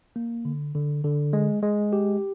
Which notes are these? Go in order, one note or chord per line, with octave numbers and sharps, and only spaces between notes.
A#3
D3
D3
D3
G#3
G#3
G4